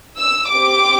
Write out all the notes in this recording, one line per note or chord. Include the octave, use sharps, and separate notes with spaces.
E6
C4 G4 D6